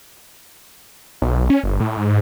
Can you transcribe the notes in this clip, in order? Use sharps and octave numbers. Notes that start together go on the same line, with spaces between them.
B1
C#4
G1
A2
G#2